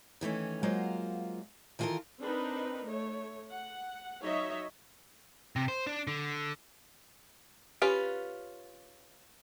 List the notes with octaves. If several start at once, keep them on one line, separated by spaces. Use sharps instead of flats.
D#3 E3 A3 C#4
F#3 G#3 A#3 F4 C5 F#5
D#3 E3 F4 G4 A4 A#4
C4 D4 D#4 A#4 B4
A3 C#5
F#5
F#3 D#4 C#5 D#5 E5
C3
C5
D4
D3
C#4 F4 G4 B4